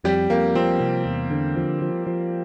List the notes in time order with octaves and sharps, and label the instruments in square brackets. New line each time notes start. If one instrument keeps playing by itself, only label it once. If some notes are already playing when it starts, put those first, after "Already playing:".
[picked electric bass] F2 [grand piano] G3 G4
[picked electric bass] F2 [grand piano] A#3
[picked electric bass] F3 [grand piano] C4
[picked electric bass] C3
E2
D3
F3
F3
F3